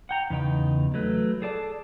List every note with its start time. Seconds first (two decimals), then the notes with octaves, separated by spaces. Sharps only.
0.09 F#5 G5 A#5
0.30 E2 C#3 D#4 G5
0.94 F#3 A3 B4
1.42 G#4 A4 D5 A5